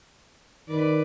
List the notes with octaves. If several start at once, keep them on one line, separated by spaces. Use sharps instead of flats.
D#3 B4 D5